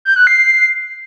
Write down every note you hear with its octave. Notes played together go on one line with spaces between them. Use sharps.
G6
F#6
C7